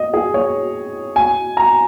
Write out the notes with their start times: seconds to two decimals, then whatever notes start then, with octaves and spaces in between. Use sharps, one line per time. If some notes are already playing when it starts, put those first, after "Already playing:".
Already playing: D#5
0.14 G#4
0.34 C#5
1.16 G#5
1.57 A#5